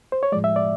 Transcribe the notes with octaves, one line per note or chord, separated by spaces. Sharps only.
C5
C#5
A2 F3 G#3 D5
E5
D5